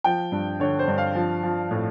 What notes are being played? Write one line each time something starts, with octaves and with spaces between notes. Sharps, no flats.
F3 G5
G2
D3 C#5
C5
G2
F5
F3
F3
A2